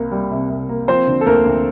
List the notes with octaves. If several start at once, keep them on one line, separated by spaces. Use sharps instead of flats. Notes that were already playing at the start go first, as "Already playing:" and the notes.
Already playing: C2 C3 A#3
G3
C3
C2
A#3
F3 C4 C5
D3
A4
D2 A#3 A#4
D2